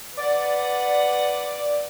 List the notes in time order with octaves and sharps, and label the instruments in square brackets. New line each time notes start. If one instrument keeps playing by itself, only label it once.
[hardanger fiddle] B4 F#5 [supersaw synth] D5